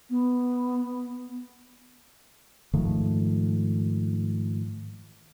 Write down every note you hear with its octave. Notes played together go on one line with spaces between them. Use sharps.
B3
G#2 D#3 F3 A3